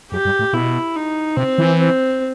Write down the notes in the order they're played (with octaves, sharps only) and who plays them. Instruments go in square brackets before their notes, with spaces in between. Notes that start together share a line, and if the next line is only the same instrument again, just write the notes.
[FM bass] F#2 [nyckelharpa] G4
[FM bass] G2
A2
[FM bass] B2 [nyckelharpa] E4
[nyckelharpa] D#4
[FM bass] C3 [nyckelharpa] C4
[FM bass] E3
[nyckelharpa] C4